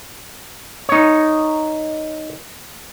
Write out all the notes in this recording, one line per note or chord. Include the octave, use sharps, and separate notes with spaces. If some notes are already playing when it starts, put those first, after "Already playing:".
D#4 C#5